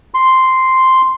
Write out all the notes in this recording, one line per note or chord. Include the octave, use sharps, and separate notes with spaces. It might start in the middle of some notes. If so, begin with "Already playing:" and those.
C6